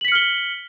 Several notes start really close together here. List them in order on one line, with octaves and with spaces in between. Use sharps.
F#7 B6 C#7 F6 G7